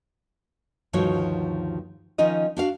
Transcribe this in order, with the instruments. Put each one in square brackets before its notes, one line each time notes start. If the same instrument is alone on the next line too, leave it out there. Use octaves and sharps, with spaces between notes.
[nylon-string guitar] D2 G2 D#3 F3 F#4 C#5
D#3 F3 C#4 D#4 F4 D#5
D4 F#4 F5